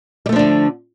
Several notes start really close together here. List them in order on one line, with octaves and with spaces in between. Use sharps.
G3 A3 F3 D4 D3